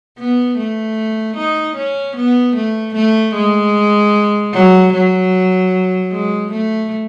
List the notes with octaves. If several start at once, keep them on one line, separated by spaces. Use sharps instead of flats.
B3
A3
D#4
C#4
B3
A3
A3
G#3
F#3
F#3
G#3
A3